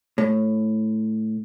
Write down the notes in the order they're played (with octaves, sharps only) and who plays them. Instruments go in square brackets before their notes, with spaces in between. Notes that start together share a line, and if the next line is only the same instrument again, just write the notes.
[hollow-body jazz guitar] A2